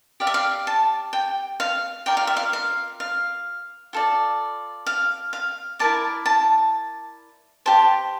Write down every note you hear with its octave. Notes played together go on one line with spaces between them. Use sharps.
G4 D5 F5
E5
F5
A5
G5
F5
F4 A#4 D5 G5
F5
E5
F5
F5
F5
F4 A4 D5
F5
F5
E4 A#4 D5 A5
A5
G4 C5 A5